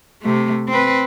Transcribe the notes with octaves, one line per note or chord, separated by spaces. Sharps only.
C3 A3
C4 B4